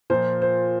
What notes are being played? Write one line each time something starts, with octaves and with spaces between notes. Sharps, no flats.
A#2 F3 A#3 C5
C5